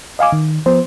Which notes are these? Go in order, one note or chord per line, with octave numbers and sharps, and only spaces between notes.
D#5 F5 G#5 D6
D#3
F3 B3 C5